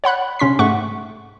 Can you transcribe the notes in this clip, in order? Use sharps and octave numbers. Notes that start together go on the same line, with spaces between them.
C#5 F#5 B5 F#6
C3 C#4 C6 B6
G#2 A3 F#5 C#6